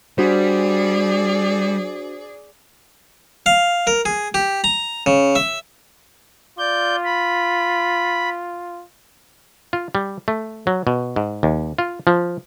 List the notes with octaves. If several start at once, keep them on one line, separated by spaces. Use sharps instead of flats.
G3 D4 F#4 G#4 C5 D5
F5
A#4
G#4
G4
A#5
C#3
E5
F4 D5 G6
B5
F4
G3
A3
F#3
B2
G#2
D#2
F4
F3